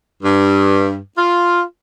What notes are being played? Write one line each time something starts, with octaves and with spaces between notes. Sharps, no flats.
G2
F4